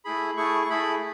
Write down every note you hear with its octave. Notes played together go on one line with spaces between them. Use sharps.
A3 E4 G#4 B5
A3 E4 G#4 C#6
C#6
A3 E4 G#4 B5